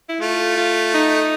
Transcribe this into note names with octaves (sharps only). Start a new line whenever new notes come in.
E4
A3 F4
F4
D#4